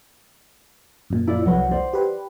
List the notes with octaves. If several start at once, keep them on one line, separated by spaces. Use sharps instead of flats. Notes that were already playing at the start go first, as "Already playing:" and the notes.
F#2 A#2
E4 F4 D5
C2 F#3 B4
C5 D5
G4 B4